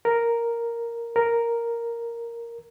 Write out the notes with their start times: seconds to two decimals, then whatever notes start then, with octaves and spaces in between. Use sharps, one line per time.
0.05 A#4
1.16 A#4